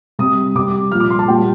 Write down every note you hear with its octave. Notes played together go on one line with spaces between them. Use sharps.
C3 G3 D#6
C3 G3 D6
A#2 F3 F6
D6
C6
A5
A#2 G3 G5